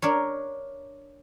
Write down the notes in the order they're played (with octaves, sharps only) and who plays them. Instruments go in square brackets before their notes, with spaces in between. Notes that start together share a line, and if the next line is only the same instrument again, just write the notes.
[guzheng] D4 A#4 C#5